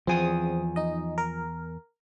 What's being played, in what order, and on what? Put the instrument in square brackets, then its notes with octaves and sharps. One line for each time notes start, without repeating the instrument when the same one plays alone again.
[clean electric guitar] E2 G#5 [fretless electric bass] F3 [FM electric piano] C4 G#4 D#6
[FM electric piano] D#4 D#5
A#4